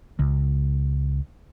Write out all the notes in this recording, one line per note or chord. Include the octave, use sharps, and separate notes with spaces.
C#2